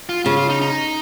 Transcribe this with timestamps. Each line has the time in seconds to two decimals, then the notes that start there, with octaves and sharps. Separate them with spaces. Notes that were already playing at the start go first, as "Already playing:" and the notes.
0.09 F4
0.25 C#3 F4
0.37 F4
0.49 D#4
0.62 D#4